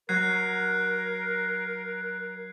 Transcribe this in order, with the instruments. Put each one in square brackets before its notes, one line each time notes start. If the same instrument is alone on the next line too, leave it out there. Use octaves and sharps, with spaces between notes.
[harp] F#3 [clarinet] A#4 [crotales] F#6 G#6 C7